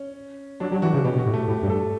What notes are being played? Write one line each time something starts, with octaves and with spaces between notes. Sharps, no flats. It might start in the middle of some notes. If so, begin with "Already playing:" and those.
Already playing: C#4
F#3 D4
F#3 G4
E3 F#4
C#3 G4
B2 G4
B2
F#4
A2
A3
A2 G4
G2
A4